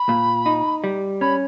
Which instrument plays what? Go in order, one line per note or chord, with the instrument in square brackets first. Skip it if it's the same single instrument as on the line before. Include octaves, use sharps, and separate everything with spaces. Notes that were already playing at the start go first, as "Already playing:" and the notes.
Already playing: [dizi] B5
[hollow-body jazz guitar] A#2
D#4
G3
[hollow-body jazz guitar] C#4 [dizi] B5